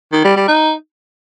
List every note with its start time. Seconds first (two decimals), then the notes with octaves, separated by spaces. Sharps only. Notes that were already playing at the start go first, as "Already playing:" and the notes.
0.13 D#3
0.24 G3
0.36 G3
0.48 D#4